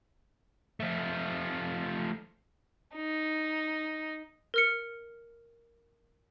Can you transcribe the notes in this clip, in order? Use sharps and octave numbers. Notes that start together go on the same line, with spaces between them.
F3 A3
D#4
A#4 F6 C#7